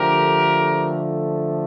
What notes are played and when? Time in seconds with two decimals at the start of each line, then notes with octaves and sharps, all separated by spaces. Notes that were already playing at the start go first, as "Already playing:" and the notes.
Already playing: D3 F3 A3 G4 A#4